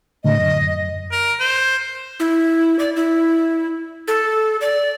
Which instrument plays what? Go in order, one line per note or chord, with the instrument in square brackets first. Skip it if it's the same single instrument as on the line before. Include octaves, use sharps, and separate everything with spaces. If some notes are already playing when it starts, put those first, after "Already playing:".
[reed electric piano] A2 D3 [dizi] D#5
[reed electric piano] F#2
[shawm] A#4
C5
[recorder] E4
D5
E4
A4
D5